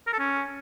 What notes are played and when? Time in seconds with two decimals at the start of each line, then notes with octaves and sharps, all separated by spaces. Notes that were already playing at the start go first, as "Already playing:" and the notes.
0.07 A#4
0.13 A4
0.19 C#4